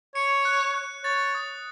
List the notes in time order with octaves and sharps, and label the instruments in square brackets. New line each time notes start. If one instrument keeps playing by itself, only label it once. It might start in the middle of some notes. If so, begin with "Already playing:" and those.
[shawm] C#5 [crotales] C#7
[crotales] F#6
F#6
[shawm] C#5 [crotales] A6
[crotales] D#6